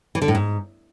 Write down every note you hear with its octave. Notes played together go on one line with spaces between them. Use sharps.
E3
D3
A2
G#2